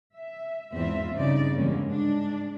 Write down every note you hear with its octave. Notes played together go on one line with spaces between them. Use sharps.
E5
E2 G#2 C4 F4 E5
G2 C#3 C4 D#4 D5
E2 D3 G3 G#3 A#3 C#4
G#2 G#3 D4